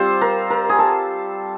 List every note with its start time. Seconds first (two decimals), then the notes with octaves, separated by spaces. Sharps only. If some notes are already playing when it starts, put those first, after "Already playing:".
Already playing: G3 C4 F4 C5
0.21 A#4
0.50 A#4
0.69 G#4
0.79 A4